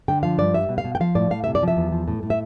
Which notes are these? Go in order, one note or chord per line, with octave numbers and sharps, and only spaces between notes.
D3 G5
F3 F5
G2 D5
G3 E5
B2
F5
B2
G5
F3 F5
A2 D5
A2 F5
C3 E5
D5
F3
E5
E2
F3
A2
A2
E5